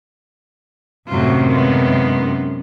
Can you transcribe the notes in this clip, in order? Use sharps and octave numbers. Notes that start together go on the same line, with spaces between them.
F#2 A2 C3 D#3 F#3 F4
G#3 B3 F4